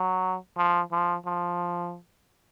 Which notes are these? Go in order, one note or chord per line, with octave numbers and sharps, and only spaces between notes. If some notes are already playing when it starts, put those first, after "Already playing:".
Already playing: F#3
F3
F3
F3